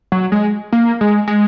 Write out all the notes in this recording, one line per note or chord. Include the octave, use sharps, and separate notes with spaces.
F#3
G#3
A#3
G#3
G#3